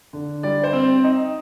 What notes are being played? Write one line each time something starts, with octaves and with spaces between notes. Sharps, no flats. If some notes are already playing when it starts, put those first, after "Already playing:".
D3
G3 D5
C5
C4
D#4